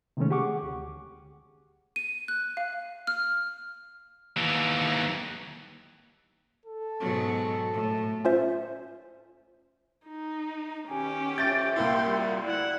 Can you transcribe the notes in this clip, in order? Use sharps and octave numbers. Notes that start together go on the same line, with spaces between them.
C3 D#3 E3 G#3 A3 C#4
G4 G#4 F#5 C#6 D6
D2
D#7
F#6
F5
F6
D#2 E3
A4
G#2 B2 F#3
A2
C#4 F4 C5 E5
D#4
B2 D#3 C#4 G4 G#5
F2 F4 C#5 E5 G6 A6 D7
C2 A#3 E4 G5 C6
G3 F4 F#4 F#5
D2 E4 D5 F#5